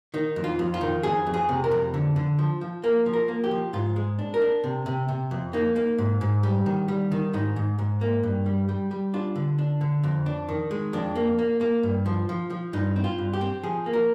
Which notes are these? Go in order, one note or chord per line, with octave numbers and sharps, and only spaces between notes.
D#3 D#4
F2
F4
F2
F4
D#3
F2 G#4
F2
G#4
C3
A#4
F2
D3
D3
F3
F3
A#3 A#4
F3
A#4
A#3
G4
F3
G#2 F4
G#3
D4
A#4
D4
C3
C3
C3
F2
A#3 D#4
A#3
G#2
G#2
G3
D#3
G3
D#3
G#2 D#4
G#2
G#2
A#3
G2
G3
G3
G3
D4 F4
D3
D4
D3
F2
D4
D#3
G#3
F2 D4
A#3
A#3
A#3
G2
F3
F3
F3
G2 D#4
C4
F4
G2
G4
C4
F3 G#4
A#3
A#4